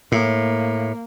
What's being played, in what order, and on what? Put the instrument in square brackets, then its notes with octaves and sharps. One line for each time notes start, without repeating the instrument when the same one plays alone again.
[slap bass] A2 [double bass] A#3